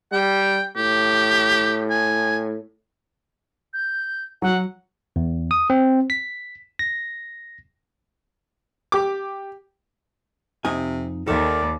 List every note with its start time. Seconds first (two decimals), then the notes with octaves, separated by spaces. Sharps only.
0.13 G3 G5
0.76 A2 G4
1.90 G#5
3.74 G6
4.42 F#3 F#5
5.16 E2
5.51 D#6
5.70 C4
6.10 B6
6.79 A#6
8.92 G4 D6
10.65 F2 C3 D#4 G#5
11.27 D#2 D#3 A4 D5 E5